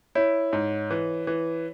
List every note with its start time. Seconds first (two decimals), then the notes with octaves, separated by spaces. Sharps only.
0.15 E4 C#5
0.53 G#2
0.90 E3
1.27 E3